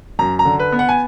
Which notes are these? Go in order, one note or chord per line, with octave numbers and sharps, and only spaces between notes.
F#2 A#5
A#5
D3
B4
B3
F#5
G#5